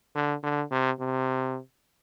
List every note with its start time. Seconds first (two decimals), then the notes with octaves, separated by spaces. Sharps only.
0.15 D3
0.43 D3
0.71 C3
1.00 C3